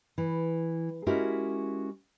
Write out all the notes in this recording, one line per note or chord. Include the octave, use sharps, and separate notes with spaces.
E3
G#3 C#4 E4 F#4 G4 A#4